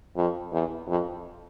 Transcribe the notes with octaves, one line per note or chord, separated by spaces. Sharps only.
F2
E2
F2